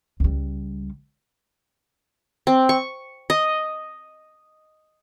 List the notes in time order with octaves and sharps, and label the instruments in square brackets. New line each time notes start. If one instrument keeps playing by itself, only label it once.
[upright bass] C#2 G3
[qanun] C4
C#6
D#5